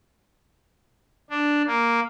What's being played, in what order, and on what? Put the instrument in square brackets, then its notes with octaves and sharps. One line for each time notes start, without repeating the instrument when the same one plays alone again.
[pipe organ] D4
A#3